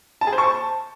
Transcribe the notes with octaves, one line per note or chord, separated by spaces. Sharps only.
A5
G#4
C5
C#6
A5